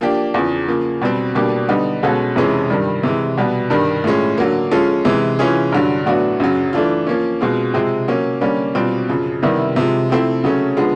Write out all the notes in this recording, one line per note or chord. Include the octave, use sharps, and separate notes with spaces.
F3 A#3 D4 G4
E2 C#3 F3
C#3 F3 A#3
B2 G3 C4
B2 G3 A#3 D4 G4
D3 G3 B3 D#4
B2 G#3 C#4 F#4 A4
F2 C3 E3 G#3 C#4
G2 D#3 G3
C3 E3 G#3
B2 G3 B3
G2 D#3 G3
A2 F3 G#3 C#4
D3 F#3 A#3
F3 G#3 C#4 F4 A4
C3 E3 G#3
E3 G#3 C#4 F4 G#4
G2 D3 F#3
A2 F#3 B3 D4 F#4
F#2 C#3 F#3
E3 A3 D4 F4
F3 A#3 C#4
B2 G#3 C4 F4
C3 F3 G#3 C4
F#3 A#3 C#4
D3 G3 A#3 C#4
B2 G3 C4 F4
F#2 C#3 F3
C3 D#3 G3 B3 E4
C3 F3 G#3
F3 A3 C4 E4
C#3 F#3 A3 C#4
D3 F3 G#3 B3